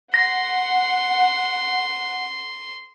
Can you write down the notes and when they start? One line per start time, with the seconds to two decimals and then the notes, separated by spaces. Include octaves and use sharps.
0.14 F#5 C6 A#6